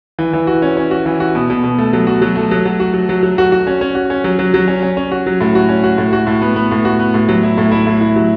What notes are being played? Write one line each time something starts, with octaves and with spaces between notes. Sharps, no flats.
E3
E3
F#4
C#4
C#4
F#4
E3
F#4
B2
B2
B2
A3
F#3
F#4
F#3
A3
F#3
F#3
F#4
F#3
F#3
F#3
F#4
F#4
C#4
C#4
F#4
C#4
F#3
F#3
F#3
C#4
C#4
C#4
F#4
F#3
A2
F#4
C#4
F#4
A2
F#4
A2
B3
B3
A2
F#4
B3
A2
F#3
E4
A2
E4
A2
E4
F#3